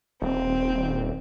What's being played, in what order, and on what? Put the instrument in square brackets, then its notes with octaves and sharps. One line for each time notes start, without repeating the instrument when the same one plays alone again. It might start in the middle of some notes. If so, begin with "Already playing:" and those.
[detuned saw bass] D#1 [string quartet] C4